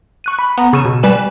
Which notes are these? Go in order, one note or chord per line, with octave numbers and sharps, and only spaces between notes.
C#6 F#6 D#7
B5
B3 A#5
C#3 C#6 E6 D#7 E7
B2
G3 B4 G#5 E7